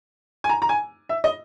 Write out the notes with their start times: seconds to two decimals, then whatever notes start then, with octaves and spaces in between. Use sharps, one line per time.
0.44 G#5
0.49 A#5
0.62 A#5
0.69 G#5
1.09 E5
1.24 D#5